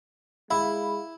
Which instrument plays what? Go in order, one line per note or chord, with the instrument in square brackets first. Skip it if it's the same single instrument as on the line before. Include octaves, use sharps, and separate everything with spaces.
[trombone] G#3 [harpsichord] E4 [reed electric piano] F5 B5